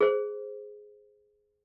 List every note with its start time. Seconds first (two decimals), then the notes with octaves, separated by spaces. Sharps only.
0.01 G#4 C5